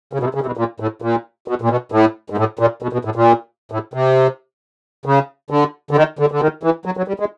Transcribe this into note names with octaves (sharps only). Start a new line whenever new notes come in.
C#3
B2
C3
C#3
C3
B2
A#2
A2
A#2
B2
A#2
B2
A2
G#2
A2
A#2
B2
B2
A2
A#2
A2
C3
C#3
D3
D3
D#3
D3
D3
D#3
E3
F#3
F#3
G3
G#3